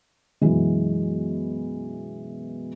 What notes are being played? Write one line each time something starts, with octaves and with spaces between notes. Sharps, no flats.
F#2 B2 E3 G#3